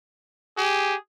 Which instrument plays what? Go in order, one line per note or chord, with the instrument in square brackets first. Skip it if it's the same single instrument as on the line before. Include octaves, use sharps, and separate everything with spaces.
[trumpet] G4 [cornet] G#4